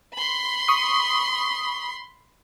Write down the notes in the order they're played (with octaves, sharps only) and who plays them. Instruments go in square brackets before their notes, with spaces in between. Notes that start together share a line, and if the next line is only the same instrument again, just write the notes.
[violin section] B5 C6
[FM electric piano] C#6 D#6